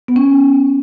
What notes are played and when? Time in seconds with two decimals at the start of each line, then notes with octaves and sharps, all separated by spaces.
0.08 B3
0.16 C#4